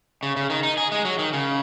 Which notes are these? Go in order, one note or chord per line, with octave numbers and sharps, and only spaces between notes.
C#3
C#3
D#3
D#4
G#4
G#3
F#3
D#3
C#3